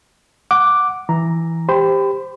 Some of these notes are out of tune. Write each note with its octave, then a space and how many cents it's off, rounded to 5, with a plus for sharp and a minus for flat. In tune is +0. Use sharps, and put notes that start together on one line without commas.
F#5 +0 D6 +0
E3 +0 A#5 +0
G4 +10 C5 +0 B5 +30